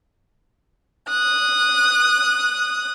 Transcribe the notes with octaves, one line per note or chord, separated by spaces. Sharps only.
D#6 F#6